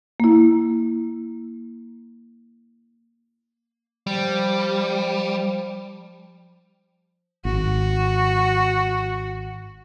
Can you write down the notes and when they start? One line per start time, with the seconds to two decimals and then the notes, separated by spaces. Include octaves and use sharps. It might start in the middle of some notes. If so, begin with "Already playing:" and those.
0.20 A#3 E4
4.07 F3 G3
7.45 G#1 F#4